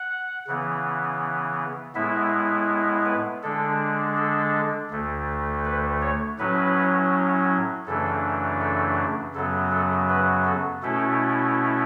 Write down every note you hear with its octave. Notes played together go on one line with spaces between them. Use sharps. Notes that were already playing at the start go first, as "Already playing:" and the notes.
Already playing: F#5
C#3 E3 B3
A2 G#3 B3 E4 E5
B4
D3 G#3 D4 A4
A4
D2 D3 A3
B4
C#5
A2 F#3 C#4 B4
F#2 C#3 E3 A3 D4 A4
A4
F#2 C#3 F#3 B3 A4
A4
B4
A4
B2 A3 C#4 E4 A4